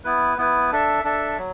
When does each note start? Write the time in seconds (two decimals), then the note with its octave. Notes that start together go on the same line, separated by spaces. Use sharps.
0.04 B3 E4 B4
0.37 B3 E4 B4
0.72 D4 A4 E5
1.04 D4 A4 E5
1.38 F#3